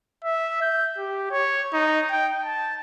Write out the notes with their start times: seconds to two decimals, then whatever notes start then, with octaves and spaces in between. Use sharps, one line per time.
0.24 E5
0.62 G6
0.98 G4
1.31 C#5
1.73 D#4
2.10 G5
2.43 A5